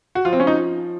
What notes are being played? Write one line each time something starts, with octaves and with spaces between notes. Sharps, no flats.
F#4
F3 F4
C4
C#4
D#4